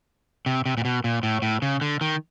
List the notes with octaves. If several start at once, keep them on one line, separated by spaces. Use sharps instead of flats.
C3
C3
A#2
B2
A#2
A2
A2
C#3
D3
D#3